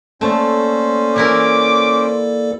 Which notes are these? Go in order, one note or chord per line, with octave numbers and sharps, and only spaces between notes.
A3 A#3 C#4 A4 C5 D5
E3 E4 A#4 D6